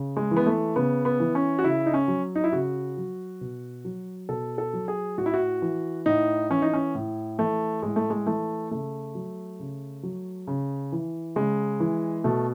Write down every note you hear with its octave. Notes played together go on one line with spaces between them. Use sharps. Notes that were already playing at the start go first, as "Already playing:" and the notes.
Already playing: C#3
G#3
E3
B3
A3
C#3 B3
B3
E3
C#4
F#4
C#3 E4
D#4
C#4
F#3
D#4
E4
C#3 F#4
F#3
B2
F#3
B2 A4
A4
F#3
G#4
A2 F#4
E4
F#4
E3
A2 D#4
E3 C#4
D#4
C#4
A2
E3 A3
A2 G#3
A3
G#3
E3 A3
C#3 A3
F#3
C#3
F#3
C#3
E3
C#3 G#3
E3
B2 A3